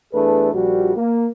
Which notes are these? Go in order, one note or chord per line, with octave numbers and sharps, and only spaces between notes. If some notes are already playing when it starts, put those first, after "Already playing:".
E2 A3 D4 G#4 A4 B4
A#1 G3 F#4
A#3